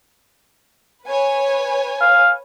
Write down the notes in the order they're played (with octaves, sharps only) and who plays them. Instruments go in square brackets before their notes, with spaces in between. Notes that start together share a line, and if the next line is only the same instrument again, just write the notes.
[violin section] B4 C#5 G#5
[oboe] F5